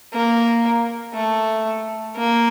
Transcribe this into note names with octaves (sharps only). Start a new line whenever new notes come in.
A#3
A3
A#3